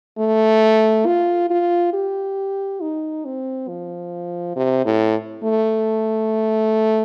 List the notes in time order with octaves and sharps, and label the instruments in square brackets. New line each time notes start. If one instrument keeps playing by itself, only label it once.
[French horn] A3
F4
F4
G4
D#4
C4
F3
C3
A2
A3